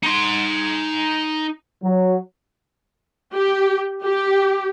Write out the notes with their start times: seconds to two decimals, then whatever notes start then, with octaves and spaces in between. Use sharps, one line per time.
0.03 D#4 C6
1.84 F#3
3.33 G4
4.03 G4